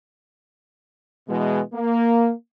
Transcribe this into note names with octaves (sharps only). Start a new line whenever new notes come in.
B2 E3 G#3
A#3